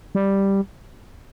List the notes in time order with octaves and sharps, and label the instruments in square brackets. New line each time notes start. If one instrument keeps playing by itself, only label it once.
[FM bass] G3